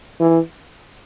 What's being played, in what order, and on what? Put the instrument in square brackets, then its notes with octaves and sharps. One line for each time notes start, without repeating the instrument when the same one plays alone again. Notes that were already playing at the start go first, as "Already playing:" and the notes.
[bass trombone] E3